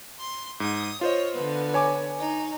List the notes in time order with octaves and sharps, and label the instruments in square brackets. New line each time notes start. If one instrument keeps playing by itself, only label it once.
[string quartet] C6
[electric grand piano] G#2 [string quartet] D#6
[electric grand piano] F4 C5 D#5 [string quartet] C#5
[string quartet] D3 B3
[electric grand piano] C#5 G#5 D6
[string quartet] D#4